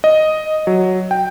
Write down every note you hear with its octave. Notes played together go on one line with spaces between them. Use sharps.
D#5
F#3
G5